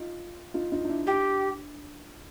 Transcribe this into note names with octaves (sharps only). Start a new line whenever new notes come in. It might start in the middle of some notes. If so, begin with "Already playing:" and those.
Already playing: D#4 F4
D#4 F4
D#4 F4
D#4
D4 E4
D4 E4 G4